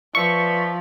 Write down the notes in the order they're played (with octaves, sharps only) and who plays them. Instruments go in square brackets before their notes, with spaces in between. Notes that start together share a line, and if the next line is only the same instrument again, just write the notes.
[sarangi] F3 [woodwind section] B4 D5 E5 [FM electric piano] C#6